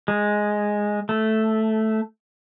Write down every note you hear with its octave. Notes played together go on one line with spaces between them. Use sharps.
G#3
A3